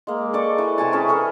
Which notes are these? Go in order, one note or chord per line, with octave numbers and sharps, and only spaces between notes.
G#3 A#3
A4 D5 C#6
E3
C3 G#5 A5
C#4 G#4 A5 B5
E3 A4 A#4 C#6